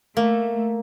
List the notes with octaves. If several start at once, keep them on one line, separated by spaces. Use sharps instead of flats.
A3 A#3